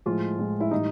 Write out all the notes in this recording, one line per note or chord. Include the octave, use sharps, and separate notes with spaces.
A2 F3 G#3 F4
A2 F3 G#3
E4
A2 E3 G3 D#4